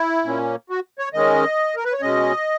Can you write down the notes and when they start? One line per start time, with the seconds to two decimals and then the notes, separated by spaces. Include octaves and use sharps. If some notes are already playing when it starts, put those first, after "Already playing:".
Already playing: E4
0.25 A#2 A#3 C#4
0.70 F#4
0.99 C#5
1.14 D#3 G#3 C#4 D#5
1.76 A#4
1.85 B4
1.93 C#5
2.02 B2 G#3 C#4 D#5